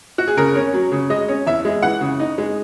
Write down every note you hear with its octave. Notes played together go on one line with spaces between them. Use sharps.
F#4
G#4
C#3 A#4
C#4
F#3
C#3
G#3 D#5
C#4
E2 E5
G#3
E3 F#5
C#3
D#4
G#3